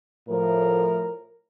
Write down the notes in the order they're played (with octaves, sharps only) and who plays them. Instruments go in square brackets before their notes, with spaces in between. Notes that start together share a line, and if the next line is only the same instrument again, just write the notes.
[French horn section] A2 F3 A#4